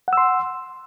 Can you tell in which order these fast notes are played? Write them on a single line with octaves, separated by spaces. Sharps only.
F#5 E6 C6